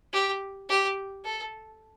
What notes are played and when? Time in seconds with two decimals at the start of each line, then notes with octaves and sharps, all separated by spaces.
0.13 G4
0.69 G4
1.25 A4